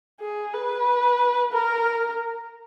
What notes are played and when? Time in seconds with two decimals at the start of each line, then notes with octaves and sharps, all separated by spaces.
0.20 G#4
0.53 B4
1.52 A#4